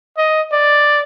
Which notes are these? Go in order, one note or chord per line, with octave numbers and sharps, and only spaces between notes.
D#5
D5